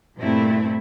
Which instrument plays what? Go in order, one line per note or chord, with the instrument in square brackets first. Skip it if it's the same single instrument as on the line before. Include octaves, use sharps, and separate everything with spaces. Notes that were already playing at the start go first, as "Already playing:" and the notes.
[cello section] G2 A#2 A3 C4 E4